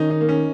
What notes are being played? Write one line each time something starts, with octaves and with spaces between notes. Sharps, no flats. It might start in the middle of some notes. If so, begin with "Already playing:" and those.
Already playing: D#3 C#4 D#4
D#4
A#3
C#4